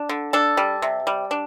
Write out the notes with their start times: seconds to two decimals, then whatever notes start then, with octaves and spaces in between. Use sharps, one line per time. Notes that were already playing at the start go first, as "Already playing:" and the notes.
Already playing: D4
0.09 D3
0.33 D4 A4
0.57 G3
0.82 C3
1.07 G3
1.31 D4